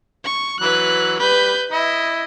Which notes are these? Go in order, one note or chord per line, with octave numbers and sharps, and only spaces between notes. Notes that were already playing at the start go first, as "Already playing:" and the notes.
C#6
E3 F#3 B4 F#6
G3 B4 B5 G6
E4 D#5